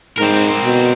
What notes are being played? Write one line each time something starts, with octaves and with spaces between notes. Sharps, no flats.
G#2 C4 A#4
B2